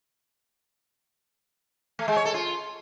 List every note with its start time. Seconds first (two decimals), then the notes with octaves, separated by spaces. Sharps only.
1.99 A3
2.08 G#3
2.17 C#5
2.25 A4
2.34 F4